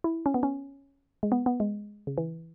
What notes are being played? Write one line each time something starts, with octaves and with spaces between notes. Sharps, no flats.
E4
C#4
B3
C#4
G#3
B3
B3
G#3
C#3
E3